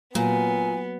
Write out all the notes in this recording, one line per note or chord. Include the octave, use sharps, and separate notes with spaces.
A#2 F#3 A#3 B3 G#5